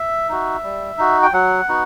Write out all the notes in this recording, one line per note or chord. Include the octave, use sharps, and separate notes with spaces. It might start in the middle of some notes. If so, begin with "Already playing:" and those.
Already playing: E5
D#4 F#4
G3
D#4 F#4
G5
F#3 F#5
B3 D#4 F#4